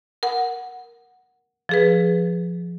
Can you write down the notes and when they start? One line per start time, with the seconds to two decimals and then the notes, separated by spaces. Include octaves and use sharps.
0.23 A#4 F#5
1.69 F3 G#4 B4